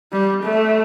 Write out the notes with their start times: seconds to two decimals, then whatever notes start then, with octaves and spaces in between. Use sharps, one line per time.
0.12 G3
0.43 A3